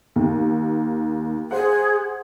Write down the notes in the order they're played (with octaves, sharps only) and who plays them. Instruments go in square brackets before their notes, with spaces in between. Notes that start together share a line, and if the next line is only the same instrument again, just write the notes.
[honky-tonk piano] D#2
[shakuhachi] G#4 [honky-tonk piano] C5 F#5